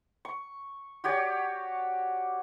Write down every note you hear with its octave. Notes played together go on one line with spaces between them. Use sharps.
C#6
F#4 G4 C#5 D5